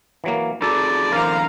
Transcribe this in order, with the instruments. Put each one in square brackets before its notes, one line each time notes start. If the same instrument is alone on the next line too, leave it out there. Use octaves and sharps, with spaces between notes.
[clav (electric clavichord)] E3 F#3 A#3
[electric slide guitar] D#4 F#4 G#4 [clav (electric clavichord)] A4 [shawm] D5
[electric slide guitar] F#2 D3 E3 [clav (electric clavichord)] A#4 C5 [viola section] F5 A#5